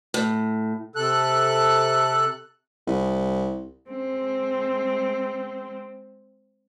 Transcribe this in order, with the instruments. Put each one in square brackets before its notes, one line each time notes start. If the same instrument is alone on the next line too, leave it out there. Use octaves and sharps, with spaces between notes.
[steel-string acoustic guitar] A2
[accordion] C3 A4 F#6
[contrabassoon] C2
[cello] G#3 C4